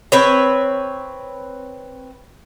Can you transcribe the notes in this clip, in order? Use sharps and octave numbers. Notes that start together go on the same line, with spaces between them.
C4 B4 C#5